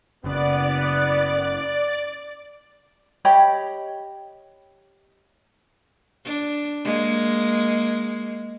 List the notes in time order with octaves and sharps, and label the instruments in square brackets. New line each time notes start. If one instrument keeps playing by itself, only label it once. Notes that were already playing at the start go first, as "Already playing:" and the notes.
[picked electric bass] F#1 C#3 [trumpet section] B3 [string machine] D5
[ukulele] G4 C#5 D#5 B5
[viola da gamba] D4
G#3 A#3